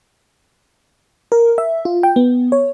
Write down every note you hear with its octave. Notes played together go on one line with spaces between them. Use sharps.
A#4
E5
F4
G5
B3
C#5